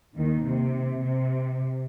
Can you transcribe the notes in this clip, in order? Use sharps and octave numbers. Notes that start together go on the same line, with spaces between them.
D#2 D#3
C3
C3